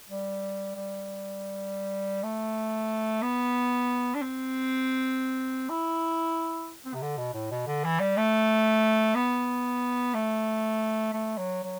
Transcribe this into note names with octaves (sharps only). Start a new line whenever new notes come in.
G3
G3
A3
B3
D4
C4
E4
C4
C3
D3
B2
A2
B2
D3
E3
G3
A3
B3
A3
A3
F#3
F#3